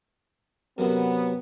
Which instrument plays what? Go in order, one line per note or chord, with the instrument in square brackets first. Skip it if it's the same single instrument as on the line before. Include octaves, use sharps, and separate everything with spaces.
[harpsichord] F#2 C3 [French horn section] B3